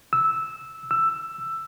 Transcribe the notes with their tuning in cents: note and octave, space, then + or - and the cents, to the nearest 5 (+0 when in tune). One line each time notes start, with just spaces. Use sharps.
E6 -10
E6 +10